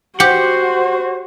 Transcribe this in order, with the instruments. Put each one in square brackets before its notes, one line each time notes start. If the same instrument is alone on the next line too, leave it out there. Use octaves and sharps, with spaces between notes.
[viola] F#4 [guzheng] G4 [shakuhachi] C5 [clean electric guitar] F#5